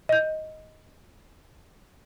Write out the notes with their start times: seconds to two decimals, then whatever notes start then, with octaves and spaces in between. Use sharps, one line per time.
0.09 D#5 G6